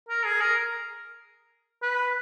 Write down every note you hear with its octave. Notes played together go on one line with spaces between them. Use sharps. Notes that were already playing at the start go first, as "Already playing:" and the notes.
A#4
G#4
A#4
B4